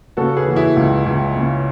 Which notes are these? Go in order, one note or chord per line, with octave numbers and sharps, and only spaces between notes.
C#3 F#4 A4
G#4 B4
E3 F#4
E4 G#4
C#2
C#2
C#3